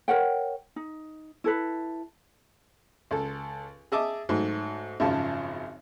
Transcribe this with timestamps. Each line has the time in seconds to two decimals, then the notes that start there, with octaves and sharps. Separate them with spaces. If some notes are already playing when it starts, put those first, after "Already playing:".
0.08 A#4 C#5 F#5 G5
0.76 D#4
1.44 E4 A4 B4
3.11 C#2 A4
3.92 G#4 D#5 E5 A5 D6
4.29 G#2 F#3 A3
5.00 G#1 F#2 C#3 F3 A5